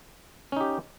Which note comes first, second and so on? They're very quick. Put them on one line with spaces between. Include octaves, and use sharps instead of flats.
C#4 D#4 G4